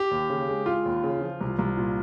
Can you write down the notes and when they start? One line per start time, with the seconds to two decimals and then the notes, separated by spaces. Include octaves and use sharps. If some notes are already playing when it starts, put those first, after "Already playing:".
Already playing: G4
0.11 D#2
0.30 C#3
0.48 G#3
0.66 G#3 F4
0.85 D#2
1.04 C#3
1.21 F3
1.41 C2
1.59 C2
1.77 A#2